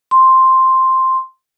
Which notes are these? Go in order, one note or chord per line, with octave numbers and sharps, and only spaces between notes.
C6